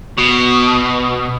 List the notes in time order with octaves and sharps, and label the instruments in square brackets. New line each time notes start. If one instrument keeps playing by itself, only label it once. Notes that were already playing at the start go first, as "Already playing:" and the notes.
[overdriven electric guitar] B2